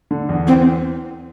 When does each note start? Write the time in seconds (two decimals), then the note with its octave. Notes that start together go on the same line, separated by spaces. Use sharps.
0.11 D3
0.29 E2
0.47 E3 C4